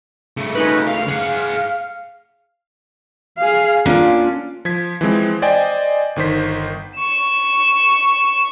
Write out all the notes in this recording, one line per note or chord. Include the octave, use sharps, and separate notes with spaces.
C#3 A3
C#4 D#4 B4
F5
G#4 F#5
G#4 F5
A#3 C#4 D4 F4
F3 G#6 B6
E3 F3 G#3 C4
C5 D5 D#5 G5 G#5
G1 D#3 C5 B6
C#6 E7